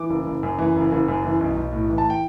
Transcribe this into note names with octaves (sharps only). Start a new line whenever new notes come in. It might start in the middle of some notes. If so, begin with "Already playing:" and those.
Already playing: E3 D6
F#1
F#1
F#2
E3
F#1
F#1
F#2
E3
B1
B1
A2
E3
A5
G5